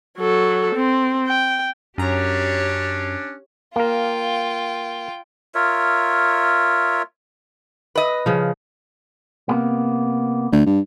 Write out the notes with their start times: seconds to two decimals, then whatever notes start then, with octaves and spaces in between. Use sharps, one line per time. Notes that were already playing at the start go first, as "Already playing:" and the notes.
0.19 F#3 A4
0.75 C4
1.27 G5
1.98 F#2 C#4 D4 G4 C#5 A#5
3.76 A#3 F4 A#4 G5
5.55 F4 A#4 C#5 E5
7.95 B4 D#5
8.26 C#3 F3
9.49 C3 A#3 B3
10.52 D2
10.66 G2